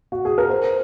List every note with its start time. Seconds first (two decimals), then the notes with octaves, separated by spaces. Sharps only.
0.12 F#4
0.25 G#4
0.38 A#4
0.50 C5